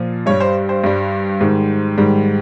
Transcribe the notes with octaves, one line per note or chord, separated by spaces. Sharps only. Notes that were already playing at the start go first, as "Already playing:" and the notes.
Already playing: A#2 F3
G2 G3 C#5
C5
C5
G2 G3
G#2 D#3 G3
G#2 D#3 G3